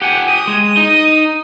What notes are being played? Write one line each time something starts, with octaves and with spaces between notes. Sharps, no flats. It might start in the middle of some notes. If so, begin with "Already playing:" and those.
G4 F#5 G#5
D#6
G#3
D#4